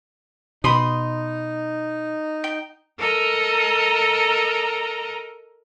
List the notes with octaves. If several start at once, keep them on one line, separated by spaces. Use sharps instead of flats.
B2 D#4 B5 C6 D#6
G5
A4 A#4 D#5 A#5